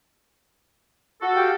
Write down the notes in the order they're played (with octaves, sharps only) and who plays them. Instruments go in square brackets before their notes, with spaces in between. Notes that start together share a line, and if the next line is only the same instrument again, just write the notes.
[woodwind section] F#4 A4
[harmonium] G4 F5 G5